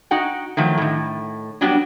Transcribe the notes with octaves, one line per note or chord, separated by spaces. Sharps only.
D#4 F#4 F#5 G5
D#3 F3 F#3 A3
A2 D#3
F#3 G3 B3 D4 F#4 G4